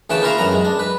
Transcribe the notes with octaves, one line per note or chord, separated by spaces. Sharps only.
D2 C#3 E3 B4 G5 A5
A#3 E4 F4 A#4 E5 F5
A1 F#2 B3 A#5
G#3
D4
B4